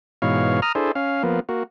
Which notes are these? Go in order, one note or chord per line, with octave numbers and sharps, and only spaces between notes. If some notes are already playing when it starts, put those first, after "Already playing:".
G#2 B2 E3 C#5 F5
A#5 D#6 F6
D4 E4 G#4 A4 C5
C#4 F5
F3 A#3 B3
A#3 F#4